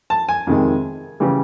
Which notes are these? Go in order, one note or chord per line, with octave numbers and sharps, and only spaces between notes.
A5
G#5
F2 C3 D#3 G#3
C#3 E3 G3